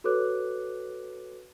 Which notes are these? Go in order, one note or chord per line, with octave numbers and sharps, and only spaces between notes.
F#4 A4 B4 C#5 D6 F#6